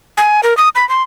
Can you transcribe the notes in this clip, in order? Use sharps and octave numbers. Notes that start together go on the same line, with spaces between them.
G#5
A#4
D#6
B5
C6